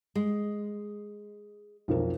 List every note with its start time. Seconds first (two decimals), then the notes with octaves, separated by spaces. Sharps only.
0.15 G#3
1.88 B1 F2 A#4